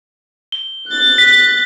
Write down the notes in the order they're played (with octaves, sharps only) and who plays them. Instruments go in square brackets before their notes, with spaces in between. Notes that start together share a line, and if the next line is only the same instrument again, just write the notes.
[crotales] G7
[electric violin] F#6 A6
[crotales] B6